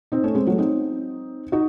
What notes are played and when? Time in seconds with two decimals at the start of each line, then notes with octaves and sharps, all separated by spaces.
0.12 C4 D#4
0.24 A3 C#4
0.35 G#3 C4
0.47 F#3 A3
0.58 C4 D#4
1.52 D#4 F#4